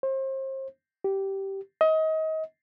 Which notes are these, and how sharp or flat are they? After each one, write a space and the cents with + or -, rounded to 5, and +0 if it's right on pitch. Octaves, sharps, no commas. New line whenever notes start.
C5 +35
G4 -10
D#5 +30